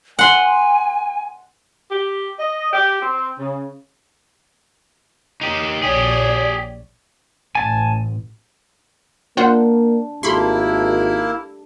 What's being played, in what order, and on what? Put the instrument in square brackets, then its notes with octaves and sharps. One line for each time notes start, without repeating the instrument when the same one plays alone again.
[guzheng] F#5 C6 [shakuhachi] G#5
[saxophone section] G4
D#5
G4
C4
C#3
[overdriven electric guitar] D#4 G4
[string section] A#1 C#5 D5 [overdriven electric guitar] G4 G#4
[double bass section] A1 [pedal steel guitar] G#5 A5
[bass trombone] A#3 [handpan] D4 [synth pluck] F4 C5 F#5
[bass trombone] G#1 [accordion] A#3 E4 [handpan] G4 A4 [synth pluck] B5 C6